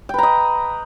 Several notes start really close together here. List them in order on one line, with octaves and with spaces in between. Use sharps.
G5 B4 A#5 D#5